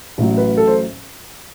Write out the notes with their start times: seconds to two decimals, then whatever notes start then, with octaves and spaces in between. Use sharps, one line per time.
0.18 A1 A2 F#3
0.37 B4
0.57 A4
0.67 C5